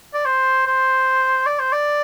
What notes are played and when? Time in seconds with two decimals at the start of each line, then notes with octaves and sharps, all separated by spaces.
0.14 D5
0.25 C5
0.66 C5
1.46 D5
1.59 C5
1.72 D5